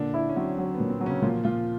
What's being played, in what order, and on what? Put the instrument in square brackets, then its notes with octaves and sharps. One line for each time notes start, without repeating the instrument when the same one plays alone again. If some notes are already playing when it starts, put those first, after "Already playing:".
Already playing: [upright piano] A#2 [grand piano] D3 D4
[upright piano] E4
[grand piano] C#4
[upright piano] F#3 [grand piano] C4
[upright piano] F#3
[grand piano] B3
[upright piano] A#2
[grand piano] C4
[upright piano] F#3
[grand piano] C#3 C#4
[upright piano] A#2 [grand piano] F3 F4
[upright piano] A#2 [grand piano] F3 F4